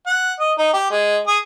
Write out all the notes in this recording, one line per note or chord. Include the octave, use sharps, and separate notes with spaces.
F#5
D#5
D#4
G4
G#3
G#4